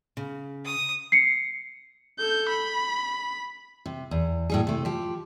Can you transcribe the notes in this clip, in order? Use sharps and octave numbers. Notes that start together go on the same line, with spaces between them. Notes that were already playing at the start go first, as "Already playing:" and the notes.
C#3
D#6
C7 C#7
A4 G6
B5
C3
E2
A2 G3 G#4
C3 A3
F3 G4